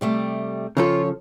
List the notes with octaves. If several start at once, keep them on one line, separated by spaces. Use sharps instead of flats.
C3 G3 A3
C#3 F3 F4 A4 C#5